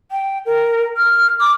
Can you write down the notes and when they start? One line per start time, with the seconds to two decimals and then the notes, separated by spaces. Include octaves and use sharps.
0.11 G5
0.46 A#4
0.97 F6
1.40 D6